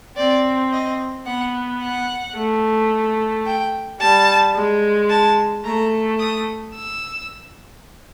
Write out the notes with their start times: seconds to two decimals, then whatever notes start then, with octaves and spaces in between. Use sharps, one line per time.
0.16 C4 D5
0.72 D#5
1.26 B3 F#5
1.82 F#5
2.36 A3
3.46 G5
4.01 G3 A5
4.55 G#3
5.10 A5
5.65 A3 A#5
6.19 D#6
6.75 E6